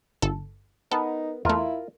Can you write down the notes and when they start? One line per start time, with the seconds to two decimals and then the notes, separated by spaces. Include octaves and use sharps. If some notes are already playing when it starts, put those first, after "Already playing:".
0.22 G1 A4
0.92 B3 D#4 A4 A#4
1.45 E2 A3 E4 F4 A#4